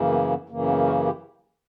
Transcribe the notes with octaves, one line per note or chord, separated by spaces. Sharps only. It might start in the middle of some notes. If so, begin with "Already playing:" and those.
Already playing: F#2 C#3 E3 A#3
B3
B3
F#2 C#3 E3 A#3
B3
F#4 A#4
E4 G4